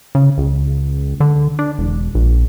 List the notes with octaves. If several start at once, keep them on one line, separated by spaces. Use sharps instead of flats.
C#3
C#2
D3
D4
E1
A#1